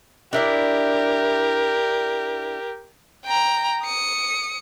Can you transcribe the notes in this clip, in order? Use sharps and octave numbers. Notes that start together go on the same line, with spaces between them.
D4 E4 G4 A#4 D5
G5 A#5
D#6 C#7